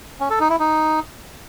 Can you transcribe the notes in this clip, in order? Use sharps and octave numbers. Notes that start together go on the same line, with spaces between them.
C#4
A4
D#4
E4
D#4